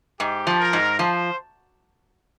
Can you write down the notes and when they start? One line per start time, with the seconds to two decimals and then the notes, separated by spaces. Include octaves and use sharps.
0.20 G#2 G4
0.47 F3
0.60 A#4
0.73 G#2
0.99 F3 C5